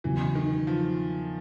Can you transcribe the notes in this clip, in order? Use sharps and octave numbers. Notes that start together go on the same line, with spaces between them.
E2 C#3 E3 F#3
D#3
F3